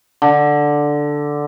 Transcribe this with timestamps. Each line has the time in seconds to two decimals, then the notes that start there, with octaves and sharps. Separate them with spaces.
0.22 D3